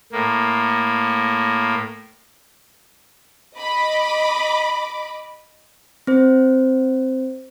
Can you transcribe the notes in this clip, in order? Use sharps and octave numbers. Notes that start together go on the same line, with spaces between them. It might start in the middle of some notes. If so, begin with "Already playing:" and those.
A2 A#3
D#5 B5 D6
C4 C5